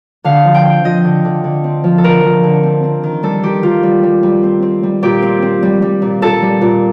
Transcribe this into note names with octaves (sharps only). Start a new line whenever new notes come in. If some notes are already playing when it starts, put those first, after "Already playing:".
D3 F5
F3
G5
C4
F3 D#5
D3
D3
D3
C4
F3
A4
D3 A#4
F3
D3
C4
C4
D#3
G3 A4
D#3 G4
D#3 F4
G3
G3
G3
C4
C4
G3
A#2 G4
C4
C4
G3
G3
A#2
A#2 A4
G3
A#2